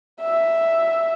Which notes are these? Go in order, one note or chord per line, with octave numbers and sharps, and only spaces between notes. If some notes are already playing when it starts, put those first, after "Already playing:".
E5